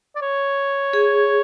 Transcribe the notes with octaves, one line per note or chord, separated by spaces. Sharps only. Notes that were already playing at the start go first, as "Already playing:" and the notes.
D5
C#5
G#4